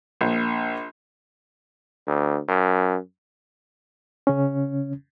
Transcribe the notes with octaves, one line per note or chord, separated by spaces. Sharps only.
A#1
D2
F#2
C#3 C#4